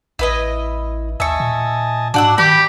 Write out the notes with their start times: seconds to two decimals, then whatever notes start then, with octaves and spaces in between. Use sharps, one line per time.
0.19 A1 E4 B4 D#5
1.20 D#2 D#5 E5 G#5 A5 C#6
1.40 A#2
2.14 G#2 D4 F#4 F#5 E6
2.38 D#3 G4 G5 B5